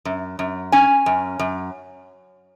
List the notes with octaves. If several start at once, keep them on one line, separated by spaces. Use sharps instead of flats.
F#2
F#2
C#4 G#5
F#2
F#2